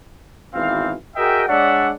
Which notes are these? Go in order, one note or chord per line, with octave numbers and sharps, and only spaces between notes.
G#1 B2 E3 C4 F5
F#4 G#4 A#4 D#5 E5 G5
G#3 D4 C#5 D5 E5 F#5